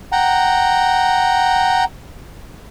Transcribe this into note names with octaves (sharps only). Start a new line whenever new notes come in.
F#5 G5 A#5